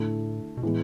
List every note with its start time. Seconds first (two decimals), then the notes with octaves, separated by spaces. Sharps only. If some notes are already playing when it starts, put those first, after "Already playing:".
Already playing: A2 D3 A3 E4
0.57 B2
0.63 A2 E3 G#3 B3